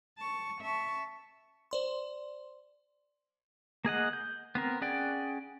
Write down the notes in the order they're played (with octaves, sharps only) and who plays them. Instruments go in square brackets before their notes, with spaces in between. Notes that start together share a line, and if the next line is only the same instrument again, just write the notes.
[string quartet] A5 C#6
E5 A5 C#6
[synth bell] C5 D5 C6
[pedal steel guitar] A#3 G#4 D#5 F#5
G6
B3 C4 A#4
C#4 G#4 D5 F#5 G5